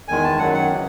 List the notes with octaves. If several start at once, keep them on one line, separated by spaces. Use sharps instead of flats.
E2 D#3 G#3 G#5
A5
F#2 D#3 F#3 F#5
F#5
C#3 E3